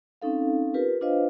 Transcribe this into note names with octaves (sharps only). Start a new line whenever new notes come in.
C4 C#4 D#4 A4 F5
F4 G4 A#4 B4
D4 F4 B4 C5 D#5 F5